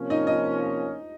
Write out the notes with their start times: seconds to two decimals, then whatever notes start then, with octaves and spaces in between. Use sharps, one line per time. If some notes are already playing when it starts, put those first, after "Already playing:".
Already playing: C3 F3 A#3 C#4
0.10 D#4 D#5
0.27 D#4 D#5